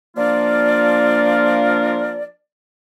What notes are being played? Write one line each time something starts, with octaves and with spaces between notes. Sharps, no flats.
F3 A#3 D4 F4 A#4 D5